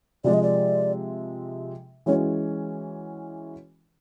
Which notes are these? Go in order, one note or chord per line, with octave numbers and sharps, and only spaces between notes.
C3 F3 G#3 D5
D#5
D5
E3 G#3 C#4 F#4 C#5